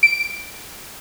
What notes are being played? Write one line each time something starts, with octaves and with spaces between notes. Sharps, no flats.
D7